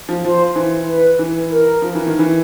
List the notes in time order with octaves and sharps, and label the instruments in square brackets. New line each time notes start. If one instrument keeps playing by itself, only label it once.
[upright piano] F3
[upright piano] F3 [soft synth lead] C5
[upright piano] E3
[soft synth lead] B4
[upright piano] E3
[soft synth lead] A#4
[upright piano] F3
E3
D#3
E3